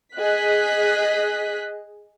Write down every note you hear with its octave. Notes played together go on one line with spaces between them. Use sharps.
G#4 D#5 F#6 B6